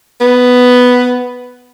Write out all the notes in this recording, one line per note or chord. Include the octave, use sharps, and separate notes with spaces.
B3